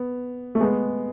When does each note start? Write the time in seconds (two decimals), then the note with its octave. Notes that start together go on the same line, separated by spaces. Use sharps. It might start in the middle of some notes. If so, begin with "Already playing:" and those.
Already playing: B3
0.55 A3
0.60 G#3 B3